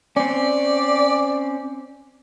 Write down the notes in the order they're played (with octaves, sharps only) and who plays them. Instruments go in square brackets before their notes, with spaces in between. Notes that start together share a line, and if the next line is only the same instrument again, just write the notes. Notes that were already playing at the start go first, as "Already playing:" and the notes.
[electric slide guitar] C4 C#4 [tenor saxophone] D5